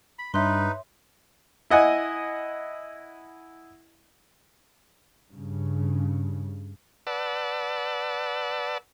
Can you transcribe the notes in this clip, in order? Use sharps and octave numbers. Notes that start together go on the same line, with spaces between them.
B5
G2 D#4 B4 C#5 E5 C6
E4 D#5 F#5 G#5
G2 C#3
B4 D5 F#5 A5 E6